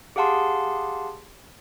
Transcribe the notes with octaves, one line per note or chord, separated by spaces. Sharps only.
G4 G#4 F5 F#5 A5 C6